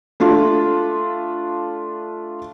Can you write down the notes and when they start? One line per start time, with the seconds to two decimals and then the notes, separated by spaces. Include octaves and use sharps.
0.20 A3 D4 F4